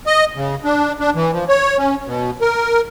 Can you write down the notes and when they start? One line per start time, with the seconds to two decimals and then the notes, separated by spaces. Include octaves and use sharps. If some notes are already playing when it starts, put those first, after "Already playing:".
0.07 D#5
0.36 C#3
0.64 D4
1.00 D4
1.15 E3
1.33 F3
1.49 C#5
1.78 C#4
2.06 B2
2.41 A#4